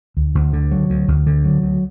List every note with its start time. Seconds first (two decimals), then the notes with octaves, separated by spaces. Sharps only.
0.17 D2
0.35 D2
0.53 D3
0.71 F#3
0.90 D2
1.08 D2
1.27 D3
1.45 F#3
1.63 D2